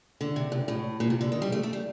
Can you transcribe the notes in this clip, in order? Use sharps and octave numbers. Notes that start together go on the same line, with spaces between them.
D3
C3
G2
A2
A#2
C3
D3
D#3
G3
A3
A3
G3